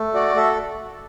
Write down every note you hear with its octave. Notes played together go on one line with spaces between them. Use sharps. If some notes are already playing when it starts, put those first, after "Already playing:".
Already playing: A3
F#4 D5
A4 E5